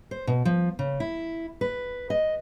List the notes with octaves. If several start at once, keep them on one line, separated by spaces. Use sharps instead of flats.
C5
B2
F3
C#3
E4
B4
D#5